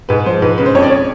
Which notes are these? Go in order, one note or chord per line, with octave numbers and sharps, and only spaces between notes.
G#2 B4
F3 C5
G#2 B4
C#3 B4
C5
F2 C#5
D5
C#5